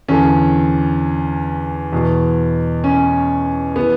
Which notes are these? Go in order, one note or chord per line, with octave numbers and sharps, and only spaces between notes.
E2 D3 C#4
E2 B2
C#4
E3 B3